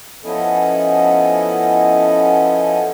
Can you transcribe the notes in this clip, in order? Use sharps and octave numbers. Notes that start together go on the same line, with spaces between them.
F3 B3 C#4 E4 A4 D#5